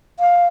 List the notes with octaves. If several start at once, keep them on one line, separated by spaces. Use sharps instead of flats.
F5